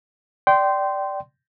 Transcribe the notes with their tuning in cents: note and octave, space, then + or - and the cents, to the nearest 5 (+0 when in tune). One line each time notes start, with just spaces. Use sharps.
D5 +0 G5 -20 C6 -10